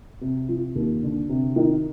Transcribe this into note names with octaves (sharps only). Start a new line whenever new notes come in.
C3
F3
D#2
D3
C3
D#3